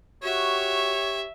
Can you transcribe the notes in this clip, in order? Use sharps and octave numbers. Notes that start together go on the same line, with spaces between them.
F#4 G4 C#5 E5